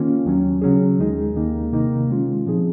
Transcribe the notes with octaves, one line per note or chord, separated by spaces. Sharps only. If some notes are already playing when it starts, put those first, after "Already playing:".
Already playing: D#3 A#3 C#4 F4
D#2 D#3 F#3 C#4
C#3 F#3 C#4 G#4
D#2 D#3 G#3 D#4 G#4
D#2 D#3 A#3 D#4
C3 D#3 A#3 D#4
D#3 G#3 C#4 F4
A#2 F3 C4 D#4 G#4